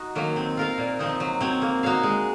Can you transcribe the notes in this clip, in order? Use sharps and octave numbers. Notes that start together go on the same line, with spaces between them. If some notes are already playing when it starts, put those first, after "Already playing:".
Already playing: D#4 F#4
D#3 F#3 A#3
C4
F4 A#4 F5
A#2
F3 C4 D#4
F#3
C4 F#4 C#5
A#3
D#4 F#4 C#5 F5
G#3